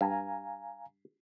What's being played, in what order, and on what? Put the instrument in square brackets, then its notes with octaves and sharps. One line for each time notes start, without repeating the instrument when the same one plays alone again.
[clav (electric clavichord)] G2 [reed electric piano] F5 G#5 A#5